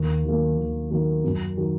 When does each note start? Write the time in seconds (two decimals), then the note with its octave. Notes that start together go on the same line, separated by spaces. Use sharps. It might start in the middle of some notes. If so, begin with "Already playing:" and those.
Already playing: D#2
0.24 D#3 F#3 A#3
0.57 D#2
0.90 D#3 F#3 A#3
1.24 F#2
1.57 D#3 F#3